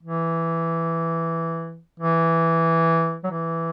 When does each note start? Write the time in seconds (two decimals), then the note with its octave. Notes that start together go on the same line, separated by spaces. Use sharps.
0.03 E3
2.00 E3
3.24 F#3
3.31 E3